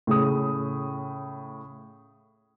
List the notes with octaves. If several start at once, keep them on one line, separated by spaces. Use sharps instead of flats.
A2 C#3 D#6